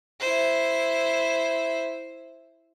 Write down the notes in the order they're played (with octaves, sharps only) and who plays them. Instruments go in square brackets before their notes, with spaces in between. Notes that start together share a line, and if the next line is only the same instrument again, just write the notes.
[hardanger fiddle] E4 C5